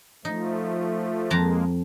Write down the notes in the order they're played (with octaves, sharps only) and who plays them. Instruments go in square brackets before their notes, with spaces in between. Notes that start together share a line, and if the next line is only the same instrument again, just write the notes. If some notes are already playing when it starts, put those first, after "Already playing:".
[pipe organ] F3 A3 [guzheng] D#4
[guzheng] F2 A5 A#5 [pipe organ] G#3 A#3